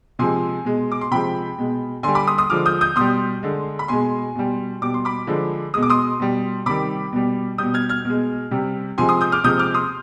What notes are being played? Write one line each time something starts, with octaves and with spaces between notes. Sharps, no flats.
C3 F3 G#3 G#5 C6
B2 G#3
D6
C6
C3 F3 G#3 G5 B5
B2 G#3
D3 G3 G#5 C6
B5 D6
C6 D#6
C6 D#6
D3 F3 G#3 D6 F6
D#6 G6
D#6 G6
B2 G3 C6 D#6
D3 G#3
B5
B2 G#3 G#5 C6
B2 G3
B2 G3 D6
C6
B5 D6
D3 F3 G#3
B2 G#3 D#6
D6
C6 D#6
B2 G3
C3 D#3 G3 B5 D6
B2 G3
B2 G3 D#6 G6
F6 G#6
F6 G#6
B2 G#3
C3 G3
C3 F3 G#3 G#5 C6
C6 D#6
D#6 G6
D6 F6
C3 F3 G#3 D#6 G6
D6 F6
C6 D#6